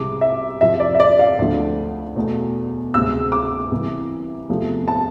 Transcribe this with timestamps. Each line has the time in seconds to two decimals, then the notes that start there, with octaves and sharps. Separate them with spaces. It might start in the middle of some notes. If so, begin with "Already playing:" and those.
Already playing: C2 C3 G#3 D6
0.21 E5
0.61 F2 C3 F3 E5
0.80 D5
0.95 E5
1.00 D5
1.19 F5
1.39 D2 D3 F3 A3
2.16 E2 B2 A3
2.94 D2 C3 G#3 E6
3.32 D6
3.72 C2 C3 E3
4.49 E2 C3 F3 A3
4.88 A5